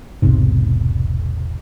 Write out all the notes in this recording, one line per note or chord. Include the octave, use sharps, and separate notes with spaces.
E1 B1 G#2 C3